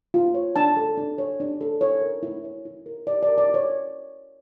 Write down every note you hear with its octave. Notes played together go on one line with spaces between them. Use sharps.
F4
C#5
D4 A5
A4
D4
C#5
D4
A4
E4 C#5
A#4
E4
C#5
E4
A#4
E4 D5
D5
A#4
D5
E4
C#5